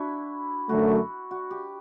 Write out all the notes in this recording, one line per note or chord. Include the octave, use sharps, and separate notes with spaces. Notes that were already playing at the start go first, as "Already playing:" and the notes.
Already playing: D4 E4 F#4
F#2 D3 F#3 A3 F#4
F#4
G4